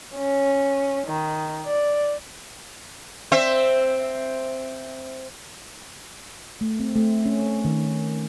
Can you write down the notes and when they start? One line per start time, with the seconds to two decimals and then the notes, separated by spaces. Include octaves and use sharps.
0.15 C#4
1.07 D#3
1.65 D5
3.32 C4 C5 E5
6.61 A3
6.80 C4
6.96 A3
7.26 C#4
7.65 D#3